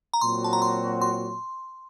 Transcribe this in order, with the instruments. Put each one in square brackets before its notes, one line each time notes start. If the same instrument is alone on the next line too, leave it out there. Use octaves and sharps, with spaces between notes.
[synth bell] A#5
[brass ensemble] A#2 F#3 C4 F#4 [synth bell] C6
[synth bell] A5
A#5
C6
C6